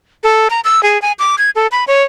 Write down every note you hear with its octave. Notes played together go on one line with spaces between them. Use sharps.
A4
A#5
E6
G#4
G#5
D6
G#6
A4
B5
C#5